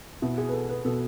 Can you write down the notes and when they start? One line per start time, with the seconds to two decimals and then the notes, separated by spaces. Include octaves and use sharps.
0.22 B2 E4
0.38 G#4
0.49 B4
0.53 A4
0.69 B4
0.85 B2 A4